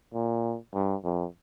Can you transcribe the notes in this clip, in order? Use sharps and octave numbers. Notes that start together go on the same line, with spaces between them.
A#2
G2
F2